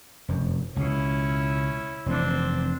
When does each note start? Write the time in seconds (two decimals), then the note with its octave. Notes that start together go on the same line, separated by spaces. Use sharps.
0.29 F1 F#2
0.76 C#2 B2 C#4 E4
2.06 F1 E3 C4 D4